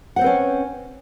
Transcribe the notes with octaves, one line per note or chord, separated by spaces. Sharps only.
C4 C#4 B4 C5 F#5